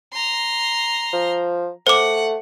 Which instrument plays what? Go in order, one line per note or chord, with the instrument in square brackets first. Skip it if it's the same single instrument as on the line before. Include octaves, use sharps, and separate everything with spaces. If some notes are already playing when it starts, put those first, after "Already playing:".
[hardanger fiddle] A#5 C6
[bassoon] F3
[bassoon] A3 [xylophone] C5 D6 [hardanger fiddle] F#5